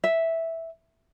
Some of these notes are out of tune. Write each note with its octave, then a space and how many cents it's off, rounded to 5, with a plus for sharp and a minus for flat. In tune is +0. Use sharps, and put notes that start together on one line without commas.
E5 -5